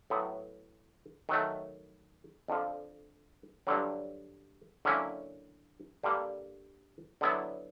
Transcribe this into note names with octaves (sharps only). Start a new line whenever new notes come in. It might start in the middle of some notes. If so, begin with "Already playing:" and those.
A2 F#3 B3
D#3 F#3 A3
F2 D3 F3
G2 D3 F#3
D3 F#3 A#3 C#4 E4
G2 D3 G3 A#3
D3 F#3 B3 E4